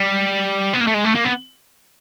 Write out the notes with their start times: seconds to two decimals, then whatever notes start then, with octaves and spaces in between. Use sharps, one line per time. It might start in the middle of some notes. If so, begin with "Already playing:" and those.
Already playing: G3
0.74 B3
0.81 A#3
0.87 A3
0.94 G#3
1.05 A3
1.15 A#3
1.25 B3